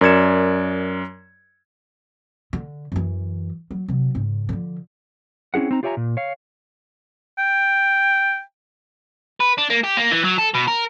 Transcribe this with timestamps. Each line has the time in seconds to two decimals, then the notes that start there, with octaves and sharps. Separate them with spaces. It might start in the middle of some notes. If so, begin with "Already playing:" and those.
0.01 F#2 A#4 D5 G#6 C#7 E7
2.53 D3
2.92 F#2 E3
3.71 F#3
3.88 C3 F#3
4.15 G#2 C#3
4.49 D3 F3
5.54 C4 C#4 E4 G#4 F#5
5.71 C4 D#4 A#5
5.83 F4 G4 C#5 E5 G#5 A#5
5.97 A#2
6.17 C#5 F5
7.38 G5
9.41 B4
9.58 D4
9.70 A#3
9.84 G4
9.97 A#3
10.11 E3
10.25 F#3
10.39 A4
10.55 B2
10.68 A#4